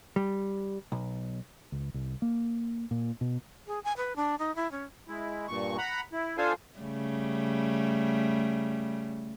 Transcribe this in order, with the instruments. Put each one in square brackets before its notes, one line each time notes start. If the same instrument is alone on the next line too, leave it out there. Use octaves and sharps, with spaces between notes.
[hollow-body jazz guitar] G3
B1
[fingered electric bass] C#2
C2
A#3
A#2
B2
[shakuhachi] G#4
G#5
B4
D4
D#4
E4
C#4
[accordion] G#3 E4
G2 A#2 C#6
F#5 A#5 B5
E4
D4 F4 A4 C5 F5 G#5
[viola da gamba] C#3 G3 A3